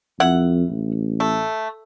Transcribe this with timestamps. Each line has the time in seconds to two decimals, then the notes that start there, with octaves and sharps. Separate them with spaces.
0.20 F2 E4 F#5
0.69 A1
1.20 A3